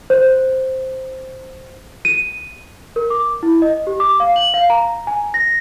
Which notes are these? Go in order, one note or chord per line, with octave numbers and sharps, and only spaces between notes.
C5
D#7
A#4
D6
E4
D#5
G4
D6
F5
F#7
F5
A#5
G#5
A#6